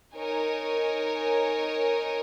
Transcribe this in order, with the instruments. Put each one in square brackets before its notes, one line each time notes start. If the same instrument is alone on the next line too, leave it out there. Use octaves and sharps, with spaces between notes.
[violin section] D#4 A#4 C#5 G#5